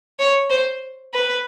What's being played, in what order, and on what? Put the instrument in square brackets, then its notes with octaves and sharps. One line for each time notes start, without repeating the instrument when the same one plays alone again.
[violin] C#5
C5
B4